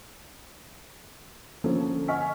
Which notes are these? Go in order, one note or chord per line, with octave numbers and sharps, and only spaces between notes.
D3 F3 A#3 C#4 A4
D#5 F#5 G#5 C#6 F6 B6